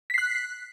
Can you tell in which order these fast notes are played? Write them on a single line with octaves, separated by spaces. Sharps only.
B6 C7 F#6